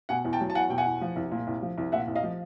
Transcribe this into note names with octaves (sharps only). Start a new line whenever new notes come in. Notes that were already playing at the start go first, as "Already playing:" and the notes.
B2 F#5 G#5
E2
G5 A5
F#3
A5
E2 F#5 G#5
B2 G5
F#5 G#5
E2
F3
C2
A#2
C2
F3
C2
A#2 E5 F#5
C2
D#5 F5
F3